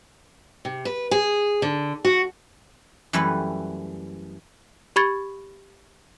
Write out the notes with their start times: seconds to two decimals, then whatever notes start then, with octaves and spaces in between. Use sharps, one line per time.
0.65 C3
0.85 B4
1.11 G#4
1.62 D3
2.05 F#4
3.13 F#2 E3 G3 A3 E4 B4
4.96 G4 B5 C#6 G#6 A6 C#7